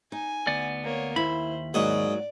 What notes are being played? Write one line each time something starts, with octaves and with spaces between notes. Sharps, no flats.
D#4 G#5
D2 B3 D5
A#3 C#5
D#2 E4 C5 B5
G#2 F#3 A#3 F#4 D5 D#5